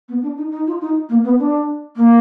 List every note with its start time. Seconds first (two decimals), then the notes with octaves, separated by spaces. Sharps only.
0.09 B3
0.22 D4
0.38 D#4
0.51 D#4
0.67 F4
0.81 D#4
1.09 A#3
1.24 B3
1.39 D4
1.96 A#3